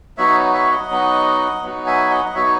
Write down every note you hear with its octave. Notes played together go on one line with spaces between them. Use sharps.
F#3 B3 D#4 F#4 C#5 E5
C#5 E5
D#5 F#5
F#3 B3 D#4 F#4
F#3 B3 D#4 F#4
E5 G#5
D#5 F#5
D#5
F#3 B3 D#4 F#4 C#5 E5